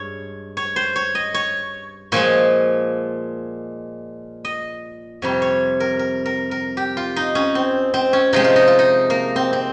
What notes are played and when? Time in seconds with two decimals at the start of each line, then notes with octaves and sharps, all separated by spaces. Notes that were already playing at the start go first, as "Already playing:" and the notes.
Already playing: G2 G#3 C#5
0.57 C#5
0.76 C5
0.96 C#5
1.15 D#5
1.34 C#5
2.12 A#2 F3 G#3 C#5
4.45 D#5
5.22 F2 C3 G3 C#5
5.42 C#5
5.80 A#4
5.99 A#4
6.26 A#4
6.51 A#4
6.77 G4
6.97 F4
7.16 D#4
7.35 C#4
7.55 C4
7.94 C4
8.13 C#4
8.33 C3 F3 G#3 D#4
8.44 F4
8.56 D#4
8.67 F4
8.79 D#4
9.10 A#3
9.36 C4
9.53 C4